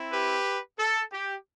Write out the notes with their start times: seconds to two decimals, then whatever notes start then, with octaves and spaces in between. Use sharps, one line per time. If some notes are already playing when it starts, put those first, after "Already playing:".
Already playing: C4 E4
0.11 G4 B4
0.79 A4
1.12 G4